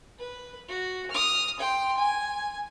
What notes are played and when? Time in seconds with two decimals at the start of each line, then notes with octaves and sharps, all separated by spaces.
0.19 B4
0.68 F#4
1.11 D#6 F6
1.59 G5 C6
1.98 G#5